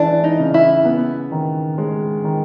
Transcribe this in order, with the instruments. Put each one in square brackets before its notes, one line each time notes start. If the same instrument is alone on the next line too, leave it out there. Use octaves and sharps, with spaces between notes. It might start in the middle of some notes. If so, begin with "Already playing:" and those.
Already playing: [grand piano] E3 G#3 C#4 [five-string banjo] D4
[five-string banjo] D#4
[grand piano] C#3
[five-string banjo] E4
[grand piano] B3
D#3
G#3
D#3